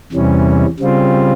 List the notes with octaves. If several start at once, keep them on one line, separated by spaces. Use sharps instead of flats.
E2 C3 E3 G3 C#4
C#3 G3 C4 F4